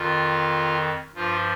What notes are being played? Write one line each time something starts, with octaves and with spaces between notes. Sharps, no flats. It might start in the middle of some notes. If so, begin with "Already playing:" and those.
Already playing: F2 D#3 F4
G2 F3 F4